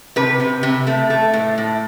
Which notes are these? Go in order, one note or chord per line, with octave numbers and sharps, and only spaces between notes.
C3 B4
C3
C3
A3
A3
A2
A2